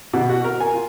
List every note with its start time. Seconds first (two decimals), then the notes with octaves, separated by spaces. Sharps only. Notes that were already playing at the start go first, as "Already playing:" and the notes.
0.13 B2
0.29 F#4
0.44 A#4
0.60 G#5
0.74 F4